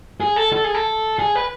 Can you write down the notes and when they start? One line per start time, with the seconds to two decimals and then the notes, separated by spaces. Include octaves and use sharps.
0.20 G#4
0.36 A4
0.53 A4
0.64 G#4
0.75 A4
1.19 G#4
1.35 B4